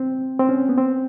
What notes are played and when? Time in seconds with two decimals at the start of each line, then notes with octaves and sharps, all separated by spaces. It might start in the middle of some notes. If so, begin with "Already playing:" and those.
Already playing: C4
0.39 C4
0.49 C#4
0.69 B3
0.78 C4